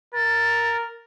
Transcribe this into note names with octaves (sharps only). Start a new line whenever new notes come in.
A#4 A6